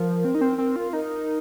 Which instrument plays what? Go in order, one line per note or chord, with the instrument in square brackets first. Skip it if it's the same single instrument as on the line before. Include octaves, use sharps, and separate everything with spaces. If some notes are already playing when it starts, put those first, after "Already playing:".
Already playing: [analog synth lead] F3 [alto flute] A#4
[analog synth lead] C4
D#4
C4
C4
F4
[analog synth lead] D#4 [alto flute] A#4